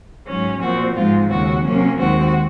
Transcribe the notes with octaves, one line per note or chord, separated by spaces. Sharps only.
G#2 F#3 C#4
A#2 F3 C4 F#4
G#2 F3 G#3 C4 F4
D#2 C#3 G#3 F#4
C3 F#3 A#3 C#4
D#2 D#3 G#3 C4 F#4